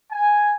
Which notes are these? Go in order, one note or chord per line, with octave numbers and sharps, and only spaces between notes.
G#5